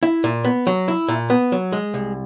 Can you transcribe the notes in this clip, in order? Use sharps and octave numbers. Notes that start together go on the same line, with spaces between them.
E4
A#2
B3
F#3
E4
A#2
B3
F#3
G#3
C2